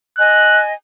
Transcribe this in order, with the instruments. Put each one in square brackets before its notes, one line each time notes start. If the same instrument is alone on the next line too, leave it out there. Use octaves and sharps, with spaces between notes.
[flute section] D#5 G#5 [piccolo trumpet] F#6